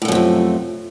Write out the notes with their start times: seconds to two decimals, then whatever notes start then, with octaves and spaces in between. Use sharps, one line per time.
0.02 A2
0.05 A3
0.08 F#2
0.12 C3
0.15 F3